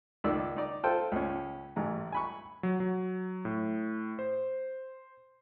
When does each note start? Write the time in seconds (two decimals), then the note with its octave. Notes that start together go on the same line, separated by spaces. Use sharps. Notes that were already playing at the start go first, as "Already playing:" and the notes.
0.24 C#2 D#3 D5 E6
0.57 D#4 D5
0.84 F4 A4 C5 G5
1.12 C#2 C#4
1.76 A1 G#2 A#5
2.12 G#5 B5 C#6
2.63 F#3
2.80 F#3
3.45 A2
4.19 C5